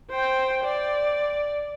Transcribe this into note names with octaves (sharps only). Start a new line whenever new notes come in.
C5 G5
D5